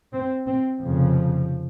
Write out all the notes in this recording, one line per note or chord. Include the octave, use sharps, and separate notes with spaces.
C4
C4
F1 F2 C#3 F3